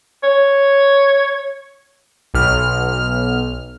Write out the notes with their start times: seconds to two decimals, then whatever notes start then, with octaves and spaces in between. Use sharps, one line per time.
0.23 C#5
2.34 B1 F6